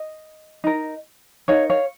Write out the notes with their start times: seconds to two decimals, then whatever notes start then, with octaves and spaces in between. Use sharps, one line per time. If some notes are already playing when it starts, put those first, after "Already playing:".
Already playing: D#5
0.64 D#4 A#4
1.48 D#4 A#4 C#5 F5
1.70 C#5 F5